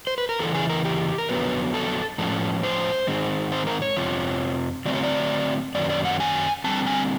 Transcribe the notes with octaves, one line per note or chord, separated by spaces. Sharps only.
C5
B4
A#4
E2 C#3 E3 A4
G#4
A#4
G4
A#4
F2 D3 F#3 B3 B4
A4
A2 F3 G#3 C#4 A4
C5
G#2 D#3 G#3 C4
C5
A#4
C#5
F2 C3 F3
D3 F#3 A3 C4 D5
C#5
D5
F#2 D#3 F#3 A#3 C#4 D5
D5
F#5
G#5
D3 G3 C4 A5
G#5